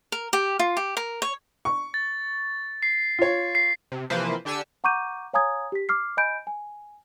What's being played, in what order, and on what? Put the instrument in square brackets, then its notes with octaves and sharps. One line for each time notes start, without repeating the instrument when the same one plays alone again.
[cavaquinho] A#4
G4
F4
G4
A#4
C#5
[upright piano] C#6
[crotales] A6
C7
[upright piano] F4 C#5
[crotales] C7
[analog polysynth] C3
C3 E3 F3 A#3 B4 C5
D3 D4 G4 G#5 E6 C#7
[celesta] F#5 A#5 C#6 D6 G6 D#7
C#5 F5 G#5 A#5 D#6 G#6
G4 B6
D6 F6 C7
D#5 G#5 B5 G6 D7
G#5